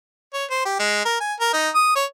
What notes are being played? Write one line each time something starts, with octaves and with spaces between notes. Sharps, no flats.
C#5
C5
G4
G#3
A#4
G#5
A#4
D#4
D#6
C#5